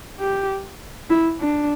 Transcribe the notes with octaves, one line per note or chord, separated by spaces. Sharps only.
G4
E4
D4